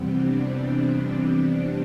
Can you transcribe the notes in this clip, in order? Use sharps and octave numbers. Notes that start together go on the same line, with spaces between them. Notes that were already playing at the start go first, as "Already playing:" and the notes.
Already playing: F2 C3 E3 G3 B3 C4
D4